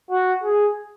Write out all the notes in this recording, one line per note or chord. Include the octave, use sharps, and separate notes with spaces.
F#4
G#4